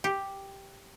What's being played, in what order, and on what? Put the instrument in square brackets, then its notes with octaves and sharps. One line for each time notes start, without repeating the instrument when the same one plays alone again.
[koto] G4